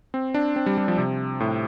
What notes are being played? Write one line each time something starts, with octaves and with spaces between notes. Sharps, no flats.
C4
D4
C4
G3
G3
F3
C3
A2